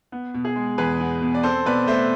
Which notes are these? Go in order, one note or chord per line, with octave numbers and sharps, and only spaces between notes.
B3
B2
G#4
G#3
E2 G#4 B4
B3
B2
D5
C4 A4 C5
B2 B4 D5
A3 C5 E5